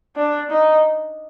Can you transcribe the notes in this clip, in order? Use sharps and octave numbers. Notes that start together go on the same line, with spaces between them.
D4
D#4